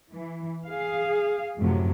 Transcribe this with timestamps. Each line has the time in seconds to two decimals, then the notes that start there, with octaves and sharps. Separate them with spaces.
0.12 E3
0.68 G#4 F5
1.59 F#2 A2 C3 F3 F#3